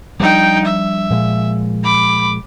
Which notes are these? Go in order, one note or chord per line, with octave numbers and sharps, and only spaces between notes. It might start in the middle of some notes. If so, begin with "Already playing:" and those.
F3 G3 D4 D#4 G5
E5
A#2 F3 G#3
B5 D6